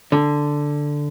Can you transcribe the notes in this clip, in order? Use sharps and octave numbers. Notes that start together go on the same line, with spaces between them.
D3